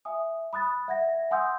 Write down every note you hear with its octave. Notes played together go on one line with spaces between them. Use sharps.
E5 G#5 D#6
B5 D#6 F#6 A6
E5 F#5 G#6 A#6
F#5 G#5 C6 D#6 E6 G6